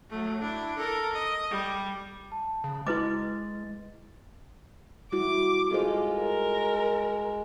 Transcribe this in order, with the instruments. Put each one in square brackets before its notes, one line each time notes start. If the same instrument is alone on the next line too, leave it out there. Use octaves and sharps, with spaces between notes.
[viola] F#3 A3
D4 E4
A4 A#4
D#5
G3
[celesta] A5
[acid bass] C#3
[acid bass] G#3 [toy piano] E4 B4 D6 [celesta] A6
[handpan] G3 E4 F#4 [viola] D6
[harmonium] G#3 [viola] F4 [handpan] G#4 A4 C5
[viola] A#4